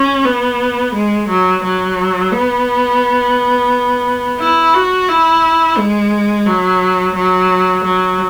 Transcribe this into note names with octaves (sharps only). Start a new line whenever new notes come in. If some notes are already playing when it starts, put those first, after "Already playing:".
Already playing: C#4
B3
G#3
F#3
F#3
B3
E4
F#4
E4
G#3
F#3
F#3
F#3